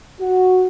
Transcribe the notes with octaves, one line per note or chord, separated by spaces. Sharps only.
F#4